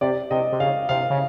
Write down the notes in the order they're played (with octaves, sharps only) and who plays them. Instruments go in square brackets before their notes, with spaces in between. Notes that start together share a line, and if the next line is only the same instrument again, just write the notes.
[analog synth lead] C3 [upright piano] D5
[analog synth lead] C3 [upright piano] D#5
[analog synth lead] C3
[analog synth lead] C#3 [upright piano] F5
[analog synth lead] C3 [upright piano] F5
[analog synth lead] C#3